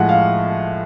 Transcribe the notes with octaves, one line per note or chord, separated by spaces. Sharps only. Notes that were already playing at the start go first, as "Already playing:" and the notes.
Already playing: A2 F3 G#3 F#5
F5